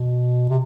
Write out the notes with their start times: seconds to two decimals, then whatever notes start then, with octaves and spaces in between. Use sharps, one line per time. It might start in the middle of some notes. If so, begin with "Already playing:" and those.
Already playing: B2
0.49 C3